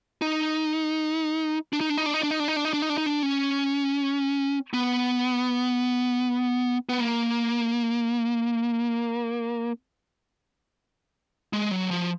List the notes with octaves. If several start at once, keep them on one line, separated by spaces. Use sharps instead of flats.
D#4
D4
D#4
D4
D#4
D4
D#4
D4
D#4
D4
D#4
D4
D#4
D4
D#4
D4
D#4
D4
C#4
B3
B3
A#3
G#3
F#3
F3